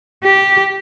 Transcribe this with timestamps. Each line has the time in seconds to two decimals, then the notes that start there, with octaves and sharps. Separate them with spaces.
0.24 G4